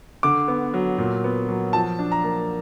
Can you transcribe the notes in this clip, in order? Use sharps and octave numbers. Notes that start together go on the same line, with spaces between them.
D3 D6
B3
F#3
A#2
B3
F#3
F3 A5
D4
A#5
A#3